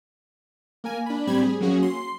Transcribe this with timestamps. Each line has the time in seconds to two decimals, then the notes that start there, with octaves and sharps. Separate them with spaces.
0.84 A#3 A#4 G#5
1.06 D4 B5
1.27 A2 G3 C4 G4 B5 G#6
1.43 G#4
1.60 F#3 A#3 C#4 F#4 G#4
1.82 C6